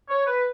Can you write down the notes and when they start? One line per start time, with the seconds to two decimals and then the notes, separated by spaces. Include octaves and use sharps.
0.09 C#5
0.26 B4